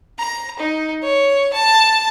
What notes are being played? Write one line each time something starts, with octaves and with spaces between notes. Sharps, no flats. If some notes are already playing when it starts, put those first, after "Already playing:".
A#5
D#4
C#5
A5